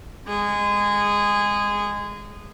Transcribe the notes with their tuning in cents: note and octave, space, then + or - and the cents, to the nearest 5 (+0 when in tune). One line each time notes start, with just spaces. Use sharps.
G#3 -20 G#4 -15